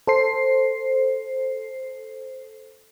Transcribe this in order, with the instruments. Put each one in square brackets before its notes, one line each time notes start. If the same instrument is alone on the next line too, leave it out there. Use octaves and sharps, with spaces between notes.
[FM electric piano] A4 C5 C7